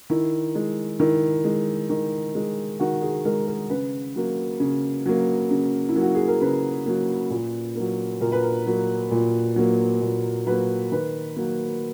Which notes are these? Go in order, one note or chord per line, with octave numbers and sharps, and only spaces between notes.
D#3 E4
G#3
D#3 E4
G#3
D#3
G#3
D#3 F#4
G#4
G#3 A#4
A#4
C#3 B4
F#3 A#3
C#3
F#3 A#3
C#3
E4
F#3 A#3
F#4
G#4
A#4
C#3 B4
F#3 A#3
A#2
F#3 A#3
A#2 A#4
B4
A#4
F#3 A#3
A#2
F#3 A#3
A#2
F#3 A#3 B4
D#3 B4
F#3 A#3